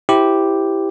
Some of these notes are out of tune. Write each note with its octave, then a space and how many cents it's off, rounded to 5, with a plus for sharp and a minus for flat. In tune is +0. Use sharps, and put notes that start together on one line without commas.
E4 +0 G4 +0 C5 +0